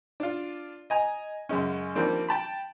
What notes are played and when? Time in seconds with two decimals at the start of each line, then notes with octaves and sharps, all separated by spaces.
0.20 D4 F4
0.90 D#5 G#5 A#5
1.49 F#2 C#3 G#3 C#4
1.95 D#3 F3 G3 A#3 C4 D4
2.29 G5 A5 B5